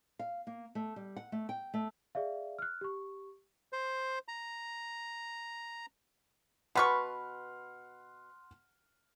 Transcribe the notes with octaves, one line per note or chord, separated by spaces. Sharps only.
F5
A#3
A3
G3
F#5
A3
G5
A3
G#4 D5 E5 F5
F6 F#6
G4 C#6
C5
A#5
B2 B4 F#5 C6 C#6 F6